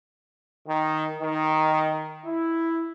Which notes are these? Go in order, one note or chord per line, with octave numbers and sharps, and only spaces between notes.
D#3
D#3
E4